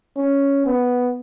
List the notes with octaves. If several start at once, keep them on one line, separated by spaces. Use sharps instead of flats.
C#4
B3